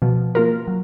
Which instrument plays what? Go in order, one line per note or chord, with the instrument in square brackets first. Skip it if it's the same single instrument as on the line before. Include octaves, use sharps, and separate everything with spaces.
[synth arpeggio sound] B2 [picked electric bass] F3
[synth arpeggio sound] A#3 F4 A#4
[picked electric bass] F#3